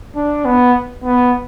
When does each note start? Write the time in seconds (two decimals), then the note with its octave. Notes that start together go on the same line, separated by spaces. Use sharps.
0.16 D4
0.45 B3
1.04 B3